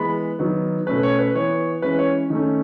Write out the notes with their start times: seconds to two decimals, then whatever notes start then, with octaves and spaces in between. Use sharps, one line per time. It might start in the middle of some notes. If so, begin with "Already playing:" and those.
Already playing: E3 G#3 B3 B5
0.39 D#3 F#3 B3
0.87 B2 A3 C#4 B4
1.03 C#5
1.19 B4
1.35 E3 B3 C#5
1.82 E3 G#3 C#4 B4
1.98 C#5
2.30 D#3 A3 C#4